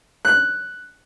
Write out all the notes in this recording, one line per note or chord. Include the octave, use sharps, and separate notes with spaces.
F#6